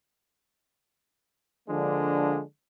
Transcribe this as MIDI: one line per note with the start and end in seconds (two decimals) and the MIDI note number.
1.69 2.41 50
1.69 2.41 53
1.69 2.41 56
1.69 2.41 58
1.69 2.41 62